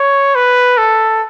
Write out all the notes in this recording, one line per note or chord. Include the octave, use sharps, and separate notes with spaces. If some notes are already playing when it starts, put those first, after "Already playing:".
Already playing: C#5
B4
A4